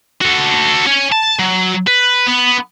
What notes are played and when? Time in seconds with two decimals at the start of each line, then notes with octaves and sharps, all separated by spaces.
0.22 F#4 A4
0.86 C#5 G#5
1.12 A5
1.39 F#3
1.87 B4
2.27 B3